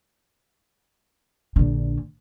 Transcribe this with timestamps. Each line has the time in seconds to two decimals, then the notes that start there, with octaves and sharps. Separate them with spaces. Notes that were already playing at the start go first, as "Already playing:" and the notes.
1.56 A#1 D3